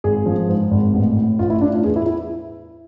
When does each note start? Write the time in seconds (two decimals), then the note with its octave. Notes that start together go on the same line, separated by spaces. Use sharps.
0.04 G#1 G#4
0.26 F3
0.48 G#2
0.71 G#1
0.94 A1
1.16 A2
1.39 A1 F4
1.50 E4
1.61 A2 D4
1.73 F4
1.84 E2 G#4
1.96 E4
2.06 E4